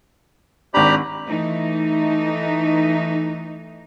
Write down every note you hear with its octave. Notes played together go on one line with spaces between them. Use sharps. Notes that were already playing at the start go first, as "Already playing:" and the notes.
G#1 D4 G4 A#5 B5
E3 A3 D#4